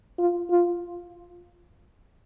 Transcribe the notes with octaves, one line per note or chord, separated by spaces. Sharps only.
F4
F4